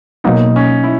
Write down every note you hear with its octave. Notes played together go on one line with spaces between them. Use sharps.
B2 F#3 A#3 D#4
C#4
E4